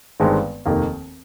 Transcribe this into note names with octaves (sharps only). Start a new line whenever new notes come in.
G1 G2 D#3 G#3 C4
F1 D#2 D#3 A#3